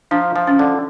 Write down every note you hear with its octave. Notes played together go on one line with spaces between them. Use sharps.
F3 D4
F3
C#4
D3